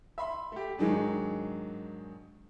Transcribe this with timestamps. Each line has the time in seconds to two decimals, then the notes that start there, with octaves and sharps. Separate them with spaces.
0.18 E5 B5 C6
0.52 A3 G4
0.78 G#2 D#3 F#3 D4 G#4